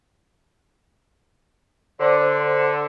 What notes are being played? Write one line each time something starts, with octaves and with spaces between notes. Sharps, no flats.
D3 C5